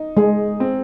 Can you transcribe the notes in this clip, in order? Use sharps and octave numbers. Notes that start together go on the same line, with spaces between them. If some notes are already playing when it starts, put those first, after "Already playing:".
Already playing: D#4
G#3 G#4
C4